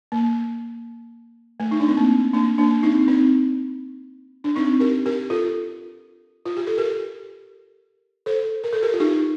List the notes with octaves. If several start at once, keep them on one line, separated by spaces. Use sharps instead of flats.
A#3
A3
D#4
D4
C4
A#3
A#3 D4
A#3 D4
C4 D#4
C4 D#4
D4
C4 D#4
G4 A#4
G4 A#4
F4 A4
F4
G4
A4
G4 A#4
A4 C5
A#4
A4
G4 A#4
F4
D#4 G4